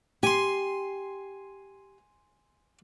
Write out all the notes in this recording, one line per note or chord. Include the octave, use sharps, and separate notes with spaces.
G4 G#5 C6